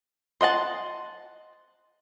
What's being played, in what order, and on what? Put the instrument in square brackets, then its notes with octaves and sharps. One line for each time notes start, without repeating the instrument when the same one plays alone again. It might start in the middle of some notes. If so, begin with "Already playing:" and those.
[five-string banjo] C5 D#5 F#5 A5